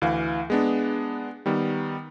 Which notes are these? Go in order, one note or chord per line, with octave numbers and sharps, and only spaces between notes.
D2 E3 F5
G#3 B3 D4
D#3 G3 B3